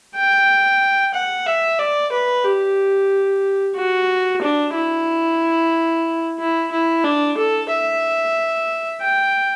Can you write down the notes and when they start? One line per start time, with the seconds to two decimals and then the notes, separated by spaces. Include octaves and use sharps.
0.16 G5
1.14 F#5
1.47 E5
1.79 D5
2.12 B4
2.44 G4
3.76 F#4
4.42 D4
4.75 E4
6.39 E4
6.72 E4
7.04 D4
7.38 A4
7.71 E5
9.02 G5